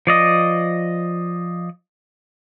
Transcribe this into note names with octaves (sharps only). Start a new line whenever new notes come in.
F3 D5 D#5